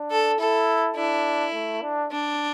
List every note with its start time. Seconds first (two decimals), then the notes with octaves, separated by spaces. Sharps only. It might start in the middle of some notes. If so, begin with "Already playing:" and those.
Already playing: D4
0.11 A4
0.39 E4 A4
0.96 D4 E4
1.54 A3
1.82 D4
2.11 D4